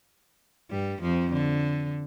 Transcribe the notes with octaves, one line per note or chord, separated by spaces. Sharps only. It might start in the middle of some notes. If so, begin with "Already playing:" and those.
G2 G3
F2 F3
D3